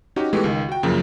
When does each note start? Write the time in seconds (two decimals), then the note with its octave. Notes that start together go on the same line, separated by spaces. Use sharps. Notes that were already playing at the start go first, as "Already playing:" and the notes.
0.16 C#4 D#4 F#4 G4
0.33 E3 G#3 A3 B3 F#4 G4
0.44 C#2 D#3
0.69 F#4 G5
0.83 F#2 C#3 F3 A#3